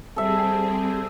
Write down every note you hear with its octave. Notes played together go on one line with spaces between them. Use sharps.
G3 C4 G#4 A4 E5